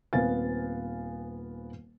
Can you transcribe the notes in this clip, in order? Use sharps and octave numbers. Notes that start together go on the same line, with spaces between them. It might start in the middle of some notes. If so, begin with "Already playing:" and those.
D#1 B3 C4 F5 G#5 A6